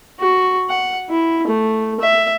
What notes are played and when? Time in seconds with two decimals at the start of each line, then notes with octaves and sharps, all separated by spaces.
0.20 F#4
0.69 F#5
1.10 E4
1.47 A3
2.01 E5